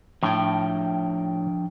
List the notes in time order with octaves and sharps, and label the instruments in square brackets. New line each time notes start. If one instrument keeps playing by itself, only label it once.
[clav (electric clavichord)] A2 [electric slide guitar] F3 D4 G5